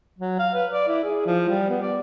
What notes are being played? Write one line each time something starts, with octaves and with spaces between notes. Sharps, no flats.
F#3
F5
B4
D5
E4
G#4
F3
G3
B3
D5